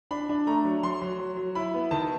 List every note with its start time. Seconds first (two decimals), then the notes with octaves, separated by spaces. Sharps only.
0.11 D4 B5
0.29 D4
0.47 A3 A#5
0.65 F#3
0.83 F#3 C6
1.01 F#3
1.19 F#3
1.37 F#3
1.55 E4 B5
1.74 B3
1.91 D#3 A5